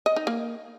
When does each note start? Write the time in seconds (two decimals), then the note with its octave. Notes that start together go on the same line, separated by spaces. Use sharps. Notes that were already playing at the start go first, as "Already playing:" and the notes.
0.06 D#5
0.16 D#4
0.27 A#3